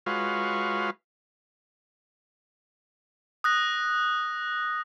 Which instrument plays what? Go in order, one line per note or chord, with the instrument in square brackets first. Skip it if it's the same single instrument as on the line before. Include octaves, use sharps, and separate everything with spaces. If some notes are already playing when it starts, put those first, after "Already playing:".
[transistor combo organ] G#3 F4 F#4 B4 C#5 F5
[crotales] D#6 F#6 A#6